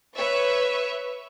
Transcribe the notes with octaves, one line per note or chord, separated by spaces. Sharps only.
B4 C#5 E5 C#6